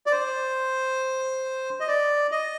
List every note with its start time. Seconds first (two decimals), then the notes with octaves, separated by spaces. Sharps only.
0.06 D5
0.11 C5
1.80 D#5
1.88 D5
2.32 D#5